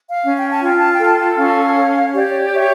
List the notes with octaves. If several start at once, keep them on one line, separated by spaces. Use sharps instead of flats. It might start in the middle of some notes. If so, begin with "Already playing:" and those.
F5
C#4
G5
A5
F4 G5
A5
G5
A4
A5
G5
C#4 F5
C#5
G4 D5
C#5 E5